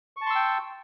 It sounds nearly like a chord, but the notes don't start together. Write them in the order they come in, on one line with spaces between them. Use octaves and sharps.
C#6 A5 C6 E6 G5